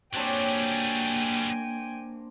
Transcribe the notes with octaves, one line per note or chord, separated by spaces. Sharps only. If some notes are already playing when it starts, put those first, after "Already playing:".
F#3 G3 A#3 C4 D4 C#5 G5 G#5